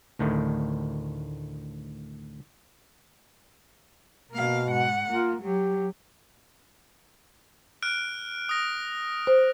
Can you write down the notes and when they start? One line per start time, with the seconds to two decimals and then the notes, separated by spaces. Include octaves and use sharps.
0.19 D2 A2 D#3
4.32 B2 A#3 F5
4.68 G#2 F#5
5.10 A#3 F4
5.42 F#3 G4
7.82 F6 F#6 D7
8.49 D#6 A#6
9.27 C5